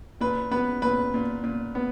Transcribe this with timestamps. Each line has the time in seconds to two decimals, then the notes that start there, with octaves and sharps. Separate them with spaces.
0.21 A#2 B4
0.51 B3 B4
0.82 A#2 B4
1.14 A#2
1.44 A#2
1.75 B3